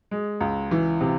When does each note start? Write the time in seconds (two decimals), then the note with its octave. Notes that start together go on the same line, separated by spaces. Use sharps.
0.11 G#3
0.40 C#2
0.71 E3
1.01 C3